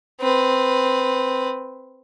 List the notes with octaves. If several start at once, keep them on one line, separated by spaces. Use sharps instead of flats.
C4 B4